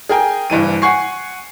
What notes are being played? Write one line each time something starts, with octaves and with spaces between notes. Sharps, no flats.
G#4 A#4 G5 G#5
F#1 G2 E3 D#7
F#5 G#5 C#6 C7